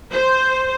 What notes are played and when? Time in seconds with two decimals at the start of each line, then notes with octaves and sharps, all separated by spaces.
0.12 C5